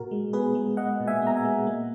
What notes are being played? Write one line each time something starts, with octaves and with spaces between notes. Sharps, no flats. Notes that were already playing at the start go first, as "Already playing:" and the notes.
Already playing: A#2 F#4 A#4
G#3
B3 G#4 B4
G#3
G#3 D#5 F#5
A#2
E5 G#5
B3 A#5
E5 G#5
G#3
A#3